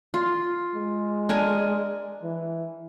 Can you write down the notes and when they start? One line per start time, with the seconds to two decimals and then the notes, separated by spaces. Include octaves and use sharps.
0.14 F4
0.75 G#3
1.29 D4 A#4 G#5
2.22 E3